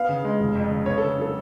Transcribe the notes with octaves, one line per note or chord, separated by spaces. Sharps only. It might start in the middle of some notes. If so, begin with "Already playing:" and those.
Already playing: B3 F5
C#3
G#3
F1
F2
C#3
B3 C#5
C#3 A4
F#3 A4